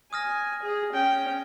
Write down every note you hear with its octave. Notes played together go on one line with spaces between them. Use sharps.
G#5 D#6 F6 A#6
G#4
C#4 G5